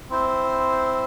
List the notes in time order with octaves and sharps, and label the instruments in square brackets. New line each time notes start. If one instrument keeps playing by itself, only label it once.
[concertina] C4 E4 C5